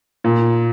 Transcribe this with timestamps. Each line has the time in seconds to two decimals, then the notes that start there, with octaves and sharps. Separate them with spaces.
0.24 A#2